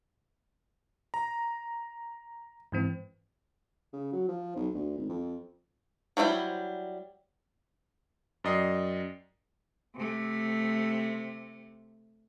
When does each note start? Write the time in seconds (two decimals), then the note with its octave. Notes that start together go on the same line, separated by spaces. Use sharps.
1.14 A#5
2.72 G#2 E3 C4
3.93 C#3
4.12 F#3
4.28 F3
4.56 B1
4.74 D2
4.98 G#1
5.09 F2
6.17 F#3 G3 D4 E4 C5
8.44 F#2 D5 D#5 G5 C7
9.96 C3 A3